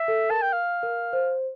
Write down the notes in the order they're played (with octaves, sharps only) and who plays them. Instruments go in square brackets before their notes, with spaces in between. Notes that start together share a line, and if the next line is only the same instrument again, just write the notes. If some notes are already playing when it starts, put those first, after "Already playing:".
Already playing: [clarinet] E5
[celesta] A4
[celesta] A#4 [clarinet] A5
[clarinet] G5
F5
[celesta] A#4
C5